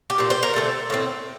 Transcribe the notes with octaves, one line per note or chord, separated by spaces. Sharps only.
G4
A#2 G3 C4
C5
A#4
D3 A3 C4
A2 A3 C4